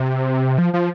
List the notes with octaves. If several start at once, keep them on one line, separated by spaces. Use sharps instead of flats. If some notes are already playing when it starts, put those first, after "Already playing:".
Already playing: C3
F3
F3